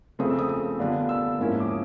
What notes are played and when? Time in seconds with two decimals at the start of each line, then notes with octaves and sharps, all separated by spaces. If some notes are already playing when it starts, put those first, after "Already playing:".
0.19 C#3 F3 A3 C4 D#6
0.30 E6
0.39 D#6
0.49 D#6
0.79 D3 G3 B3 D4 F4
1.09 E6
1.39 G#2 F3 A#3 C#4 E4
1.60 D6
1.69 D#6